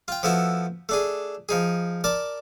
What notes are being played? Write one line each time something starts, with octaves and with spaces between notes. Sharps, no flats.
F4 G5
F3 A3 B3 E4 F#4
A3 D4 G#4
F3 D#4 G#4
A#4 D5 A5